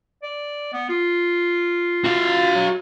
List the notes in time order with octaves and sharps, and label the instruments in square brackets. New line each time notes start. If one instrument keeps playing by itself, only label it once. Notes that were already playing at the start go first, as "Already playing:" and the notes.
[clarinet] D5
B3
F4
[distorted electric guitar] F#4 F5
[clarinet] F#3